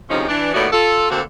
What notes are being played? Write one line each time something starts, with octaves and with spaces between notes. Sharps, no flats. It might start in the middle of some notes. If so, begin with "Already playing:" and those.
D2 C3 F3 G#3 C#4 D#4
E3 D4
D#2 A2 A3 B3 F#4 D5
F4 A4
D2 D3 A#3 C4 F#4 A4